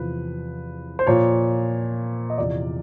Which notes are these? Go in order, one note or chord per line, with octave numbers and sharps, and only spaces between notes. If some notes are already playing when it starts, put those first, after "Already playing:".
Already playing: E2 C3 F3 B4
C5
A#2 F3 C#5
D#5
E2 C3 F3 D5